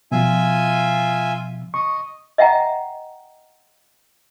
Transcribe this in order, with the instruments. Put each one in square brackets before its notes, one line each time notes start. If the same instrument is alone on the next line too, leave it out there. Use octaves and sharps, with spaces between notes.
[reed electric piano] B2 F3 [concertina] F4 E5 G#5
[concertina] D#5 [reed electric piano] C#6
[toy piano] D#5 E5 F#5 G5 A#5